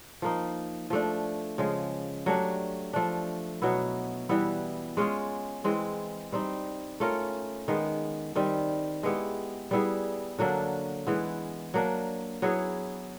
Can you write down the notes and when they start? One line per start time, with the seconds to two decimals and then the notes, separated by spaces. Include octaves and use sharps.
0.22 F3 A#3 D#4
0.90 F3 A3 D4
1.58 C#3 F3 G#3
2.26 F#3 A3 D4 G4
2.93 F3 A3 D4
3.62 B2 F#3 B3 E4
4.29 E3 G3 B3 E4
4.97 G#3 C#4 F4 G#4
5.64 E3 G#3 C4
6.32 G3 C4 D#4
7.00 A3 C#4 F4 A#4
7.68 D#3 G#3 B3
8.35 D#3 G3 C4
9.03 G#3 B3 E4 G4
9.71 G3 B3 E4 G#4
10.38 D3 F#3 A#3 D4
11.07 E3 G#3 B3
11.74 F#3 A#3 D4
12.42 F#3 B3 E4 G#4